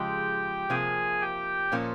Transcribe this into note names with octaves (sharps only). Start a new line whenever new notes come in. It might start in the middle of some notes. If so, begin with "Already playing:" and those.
Already playing: C#3 F3 G#3 G4 G5
C3 F3 A#3 G#4 G#5
G4 G5
A#2 F3 A#3 C#4